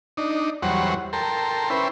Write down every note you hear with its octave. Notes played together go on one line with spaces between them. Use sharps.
D4 D#4
E2 F#3 G3 C5 C#5 F#5
A4 A#4 G5 C6
C#4 E4 B4 C5 G5